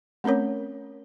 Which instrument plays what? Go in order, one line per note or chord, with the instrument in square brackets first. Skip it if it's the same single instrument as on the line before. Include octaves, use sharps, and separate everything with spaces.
[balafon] A3 C4 C#4 A#4 C#5